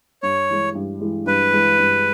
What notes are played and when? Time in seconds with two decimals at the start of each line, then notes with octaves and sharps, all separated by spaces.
0.23 G2 C#5
0.49 E3 G#3
0.75 G2
1.00 E3 G#3
1.26 G2 B4
1.53 E3 G#3
1.78 G2